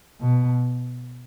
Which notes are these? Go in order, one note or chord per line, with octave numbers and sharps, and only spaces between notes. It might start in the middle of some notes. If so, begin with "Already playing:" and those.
B2